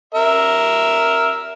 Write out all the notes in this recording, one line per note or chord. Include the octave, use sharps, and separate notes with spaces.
A#4 E5